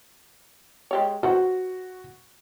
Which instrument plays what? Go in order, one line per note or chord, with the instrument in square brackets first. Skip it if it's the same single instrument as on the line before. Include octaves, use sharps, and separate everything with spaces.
[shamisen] G#3 G4 C#5
[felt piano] F#4 [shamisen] B4 C5 F#5